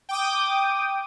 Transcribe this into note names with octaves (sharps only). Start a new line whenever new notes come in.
G5 D6 D#6